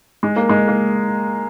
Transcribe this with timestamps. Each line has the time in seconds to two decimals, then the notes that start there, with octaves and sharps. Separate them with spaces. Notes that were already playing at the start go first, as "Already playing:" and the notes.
0.23 G#3
0.36 A#3
0.49 G#3
0.68 A#3